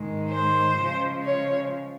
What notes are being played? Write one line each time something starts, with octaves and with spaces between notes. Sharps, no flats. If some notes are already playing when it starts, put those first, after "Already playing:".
Already playing: G#2 D#3 G#3
C5
C#3 F3 G#3
C#5